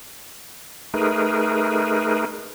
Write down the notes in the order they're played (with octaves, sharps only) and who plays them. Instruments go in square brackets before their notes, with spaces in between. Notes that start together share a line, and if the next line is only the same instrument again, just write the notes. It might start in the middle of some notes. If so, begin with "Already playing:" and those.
[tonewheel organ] A3 D#4 G#4 A#4 B4